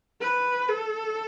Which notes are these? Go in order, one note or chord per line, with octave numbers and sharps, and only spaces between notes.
B4
A4